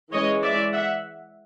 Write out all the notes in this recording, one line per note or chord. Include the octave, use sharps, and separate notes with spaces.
E3 G#3 C#4 C#5 D#5
D5 E5
E5 F#5